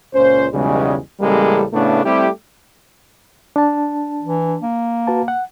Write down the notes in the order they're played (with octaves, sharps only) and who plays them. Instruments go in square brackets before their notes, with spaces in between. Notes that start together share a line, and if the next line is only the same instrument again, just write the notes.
[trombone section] C#2 A#2 C#4 C5
B1 E2 C#3 G3 G#3
A1 C#3 G3 G#3 A#3 A4
A2 C#3 A3 B3 D4
G3 A3 C4 E4 G4
[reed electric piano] D4 A5
[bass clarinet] E3
A#3
[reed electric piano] F#4 B4 A5
F#5